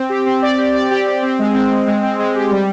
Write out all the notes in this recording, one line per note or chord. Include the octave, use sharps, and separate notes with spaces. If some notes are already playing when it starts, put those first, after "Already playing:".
Already playing: C4
G4
C4
D5
G4
D5
G4
G4
C4
G#3
C4
G#3
G#3
C4
G#3
G4
G3